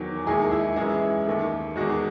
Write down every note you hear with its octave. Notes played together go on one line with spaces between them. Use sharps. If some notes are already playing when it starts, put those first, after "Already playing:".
Already playing: E2 D#3 F#3
D#2 D#3 G#3 E4 G#4
E4
F#2 E3 G#3 E4
D#2 D#3 A3
E2 D#3 G#3 F#4